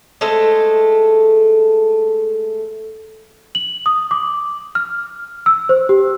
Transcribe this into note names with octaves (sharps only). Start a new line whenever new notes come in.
G#3 A3 A4 C5
F#7
D#6
D6
F6
E6
C5
G4